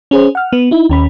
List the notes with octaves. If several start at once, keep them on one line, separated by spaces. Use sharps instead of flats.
C#4 G#4 C5
F#5 F6
B3
D#4 E4
D#2 C#4 B5